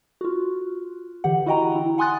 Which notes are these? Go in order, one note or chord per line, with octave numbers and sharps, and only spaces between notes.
F4 F#4
D3 E3 G4 F#5
E4 F#4 D#5 G5 A#5
E4
F#5 G#5 C6 D#6 F#6 A6